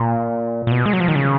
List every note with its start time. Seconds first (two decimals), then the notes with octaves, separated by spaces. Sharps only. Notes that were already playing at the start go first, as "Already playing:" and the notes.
Already playing: A#2
0.67 A#2
0.71 B2
0.86 G#3
0.93 F#3
1.00 F3
1.08 D#3
1.16 C#3